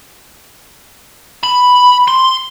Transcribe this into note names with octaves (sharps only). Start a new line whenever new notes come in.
B5
C6